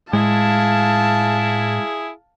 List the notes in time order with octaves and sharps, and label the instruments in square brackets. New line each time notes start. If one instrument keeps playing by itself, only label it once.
[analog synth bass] A2 [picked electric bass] G#3 [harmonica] E4 G#4 [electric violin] F5 A5